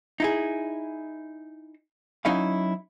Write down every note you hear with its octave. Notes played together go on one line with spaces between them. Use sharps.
D#4 E4 G#4
F#3 C#4 D#4 E4 F5